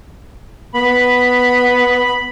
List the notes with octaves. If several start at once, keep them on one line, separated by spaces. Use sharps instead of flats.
B3 B5